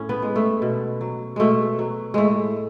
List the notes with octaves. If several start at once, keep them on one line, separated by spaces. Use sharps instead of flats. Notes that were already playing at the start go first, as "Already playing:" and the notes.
Already playing: A2 C#4
B3
G#3
A3
B2
F#3
B2 G#3 A3
F#3
A2 G#3 A3